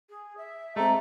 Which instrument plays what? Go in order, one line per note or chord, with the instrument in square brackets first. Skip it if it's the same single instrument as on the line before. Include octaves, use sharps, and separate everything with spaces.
[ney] G#4
E5
[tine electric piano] G#3 C4 [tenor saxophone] A3 [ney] A#5